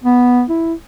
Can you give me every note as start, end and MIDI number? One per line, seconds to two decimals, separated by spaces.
0.04 0.44 59
0.49 0.74 64